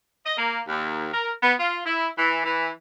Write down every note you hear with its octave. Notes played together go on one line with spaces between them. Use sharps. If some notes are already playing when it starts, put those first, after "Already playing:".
D#5
A#3
D#2
A#4
B3
F4
E4
E3
E3